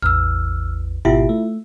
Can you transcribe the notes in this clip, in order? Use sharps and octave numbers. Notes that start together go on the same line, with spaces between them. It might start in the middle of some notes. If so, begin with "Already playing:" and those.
A1 E2 E6 F6
G#1 B2 E4 F4 G4 E5
A3